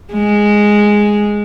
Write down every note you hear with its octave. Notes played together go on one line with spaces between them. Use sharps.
G#3